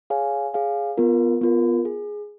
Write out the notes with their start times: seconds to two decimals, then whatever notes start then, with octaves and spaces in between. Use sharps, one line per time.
0.10 G#4 C#5 F5 G#5
0.54 G#4 C#5 F5 G#5
0.97 B3 F4 A#4
1.41 B3 F4 A#4
1.85 G#4